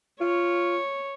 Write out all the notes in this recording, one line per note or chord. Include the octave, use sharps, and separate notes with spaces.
F4 C#5